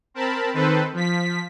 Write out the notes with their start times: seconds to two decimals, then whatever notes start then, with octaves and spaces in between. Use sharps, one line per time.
0.14 C4 A#4 A5 B5
0.54 D#3 C4 A4 B4 C5
0.93 F3 B6